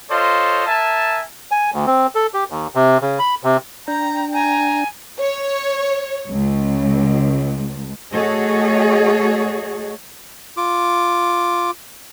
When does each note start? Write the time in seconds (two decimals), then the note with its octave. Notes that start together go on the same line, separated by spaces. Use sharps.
0.10 F4 A4 C5 C#5 D#5
0.67 A#4 E5 G#5 A5
1.51 G#5
1.74 D2
1.86 C4
2.15 A4
2.34 G4
2.50 D#2
2.75 C3
3.02 C#3
3.19 B5
3.43 C3
3.88 D4 G5 A#5
4.33 G#5 A#5
5.20 C#5
6.29 C#2
8.13 A3 F#4 G#4 A4 C#5 D#5
10.57 F4 D6